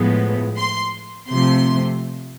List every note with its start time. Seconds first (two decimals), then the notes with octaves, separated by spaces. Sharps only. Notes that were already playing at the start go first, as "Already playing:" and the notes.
Already playing: A2 F3 G#3 B3
0.56 C6
1.29 C3 F3 A3 C6